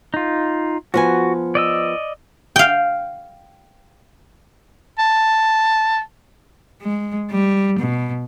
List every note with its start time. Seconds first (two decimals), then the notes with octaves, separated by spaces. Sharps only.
0.14 D#4 F4
0.94 F3 B3 F#4 G#5
1.55 D5 D#5 E6
2.56 F5 G5
4.99 A5
6.82 G#3
7.31 G3
7.79 B2